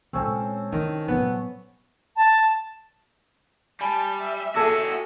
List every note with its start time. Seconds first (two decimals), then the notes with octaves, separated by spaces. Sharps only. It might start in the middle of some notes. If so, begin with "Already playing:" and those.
0.13 A#2 G#3 C4 C#4 A4
0.72 D#3 E4
1.08 A#2 F#3 B3
2.16 A5
3.81 G3 G#5 A5 B5
4.20 E5
4.55 F#4 G#4 A4 A5 D6 E6 G#6